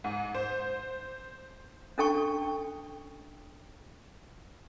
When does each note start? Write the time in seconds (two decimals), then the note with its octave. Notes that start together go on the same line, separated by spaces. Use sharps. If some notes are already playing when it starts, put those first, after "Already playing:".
0.04 G#2
0.35 C5
1.98 C#4 D4 A4 G5 A5 C#6